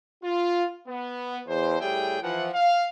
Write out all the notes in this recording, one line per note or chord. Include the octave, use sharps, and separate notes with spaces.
F4
B3
E2 C5
A2 G3 G4 G#4 E5 G5
E3 F3 F#5
F5